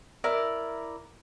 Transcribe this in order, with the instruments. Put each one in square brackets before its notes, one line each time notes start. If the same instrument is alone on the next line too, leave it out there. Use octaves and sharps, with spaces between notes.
[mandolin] E4 A#4 D5